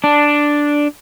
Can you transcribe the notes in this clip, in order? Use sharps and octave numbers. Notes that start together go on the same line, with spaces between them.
D4